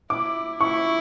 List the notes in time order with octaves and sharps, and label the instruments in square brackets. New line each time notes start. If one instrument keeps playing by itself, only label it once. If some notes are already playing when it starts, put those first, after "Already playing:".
[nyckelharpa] E4 [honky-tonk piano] D6
[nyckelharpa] E4 [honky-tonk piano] C#6